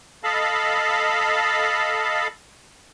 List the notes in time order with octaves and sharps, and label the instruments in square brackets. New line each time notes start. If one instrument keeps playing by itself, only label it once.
[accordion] A4 D#5 F5 A5 B5